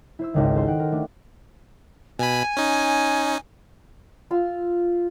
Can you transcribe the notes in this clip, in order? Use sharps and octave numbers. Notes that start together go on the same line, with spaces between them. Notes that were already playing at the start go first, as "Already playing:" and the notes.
E4 C5 E6
G#1 C#2 D#3
A4 C5 C6
D#4 F#5 G5
A#4
A3 D4
B2 G#5 B5
C#4 D#4
F4 F5 E6